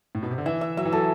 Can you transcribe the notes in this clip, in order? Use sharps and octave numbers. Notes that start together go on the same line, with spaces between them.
A2
B2
C3
D3
E3 E5
E5
F#3 E5
E3
F#3 A4